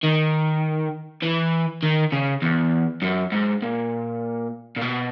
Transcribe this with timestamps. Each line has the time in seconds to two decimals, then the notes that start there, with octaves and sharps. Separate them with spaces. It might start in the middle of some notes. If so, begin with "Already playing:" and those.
0.03 D#3
1.22 E3
1.83 D#3
2.12 C#3
2.42 E2
3.02 F#2
3.32 G#2
3.62 A#2
4.76 A#2
4.81 B2